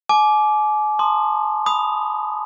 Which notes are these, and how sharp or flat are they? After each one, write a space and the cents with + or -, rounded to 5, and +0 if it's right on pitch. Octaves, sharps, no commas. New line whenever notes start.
G#5 +40 D6 +0
A5 +30 C6 +0 D#6 -30
B5 +0 D#6 +0